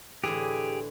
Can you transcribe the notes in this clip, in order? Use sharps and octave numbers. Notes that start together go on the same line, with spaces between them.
A2 D3 E3 G4 G#4